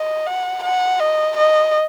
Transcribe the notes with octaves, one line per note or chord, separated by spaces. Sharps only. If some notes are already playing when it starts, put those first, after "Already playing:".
Already playing: D#5
F#5
F#5
D#5
D#5